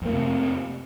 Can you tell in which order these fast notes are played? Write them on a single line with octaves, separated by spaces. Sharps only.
F2 A#3 A3 C3